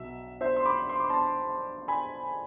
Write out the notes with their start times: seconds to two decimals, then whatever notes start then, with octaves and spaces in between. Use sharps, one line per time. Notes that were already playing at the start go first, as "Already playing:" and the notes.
Already playing: B1 B2 E5
0.41 C5 E5
0.57 C6
0.66 B5 D6
0.89 C6
1.00 D6
1.10 A5 C6
1.88 G#5 B5